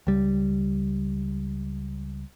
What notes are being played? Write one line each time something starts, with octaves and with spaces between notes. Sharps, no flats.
C#2 G3